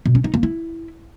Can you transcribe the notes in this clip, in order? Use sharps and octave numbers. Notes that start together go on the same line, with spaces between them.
B2
C#4
D#4
A#3
E4